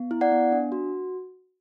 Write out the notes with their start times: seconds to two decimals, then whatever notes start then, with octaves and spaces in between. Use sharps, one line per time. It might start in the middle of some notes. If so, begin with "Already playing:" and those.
Already playing: B3
0.11 E4
0.21 D5 F#5
0.32 B3
0.52 D4
0.72 F#4